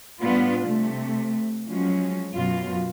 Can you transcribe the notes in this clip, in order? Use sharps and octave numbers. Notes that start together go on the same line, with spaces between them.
A2 G3 B3 D4 F4
C3 A3
F3 F#3 G#3 C#4
F#2 B2 F4